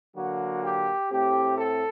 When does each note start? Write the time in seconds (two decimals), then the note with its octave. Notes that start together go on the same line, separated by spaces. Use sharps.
0.15 D3 F#3 A#3 F#4
0.63 G4
1.09 A2 A3 C4 G4
1.56 A4